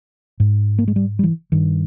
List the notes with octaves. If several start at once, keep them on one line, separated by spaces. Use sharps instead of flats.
G#2
A#3
G#3
G3
G3
E3
G2 D#3